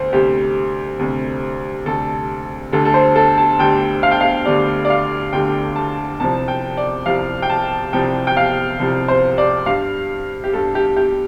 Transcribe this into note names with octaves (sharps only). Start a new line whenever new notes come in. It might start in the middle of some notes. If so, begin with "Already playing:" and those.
Already playing: D2 C5
D2 C3 G3 G4
D2 C3 G3
D2 C3 G3 A4
D2 D3 G3 A4
A4
C5
A4
A5
D2 D3 G3 G5
F5
G5
F5
D2 D3 G3 D5
D5
F5
D2 D3 G3 G5
A5
C2 C3 F3 A5
G5
D5
C2 C3 F3 F5
G5
A5
C2 C3 F3 G5
G5
F5
C2 C3 F3
C5
D5
G2 G3 F5
G4
G2 G3 A4
G4
G4